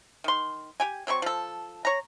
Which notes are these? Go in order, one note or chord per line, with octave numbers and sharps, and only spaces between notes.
D#3 C6
G4 G5 G#5
F#3 C4 C5 C#6
F3 A4
C#5 A#5